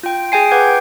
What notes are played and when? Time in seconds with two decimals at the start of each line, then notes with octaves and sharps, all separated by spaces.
0.03 F4 G5
0.32 G#4 G5 G#5 C7
0.51 B4 F#5 G5 D6 G6 G#6